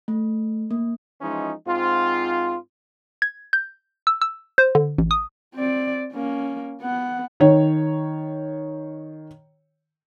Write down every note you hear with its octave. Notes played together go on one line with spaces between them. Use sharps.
A3
A#3
E3 F3 G#3 C#4 D#4
G#2 C4 F4
G#6
G6
E6
E6
C5
D3
A1
D#6
C4 D5
A#3 C#4
B3 F#5
D#3 C#5